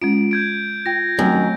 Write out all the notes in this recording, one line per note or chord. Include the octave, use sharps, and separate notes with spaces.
G#3 C#4 F4 D7
G6 G#6 D7
F4 G5 A#6
F#2 D#3 F#3 A3 C4